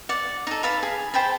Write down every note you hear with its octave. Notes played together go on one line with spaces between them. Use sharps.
D5 F#5
D#4 A4
B4 F5 A5 B5
G#4
C5 G5 A5 B5